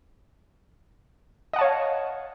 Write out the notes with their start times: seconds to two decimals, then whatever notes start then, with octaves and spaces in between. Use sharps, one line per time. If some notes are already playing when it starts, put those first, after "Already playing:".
1.53 D#5
1.56 F#5
1.59 A5
1.61 C#5
1.64 F5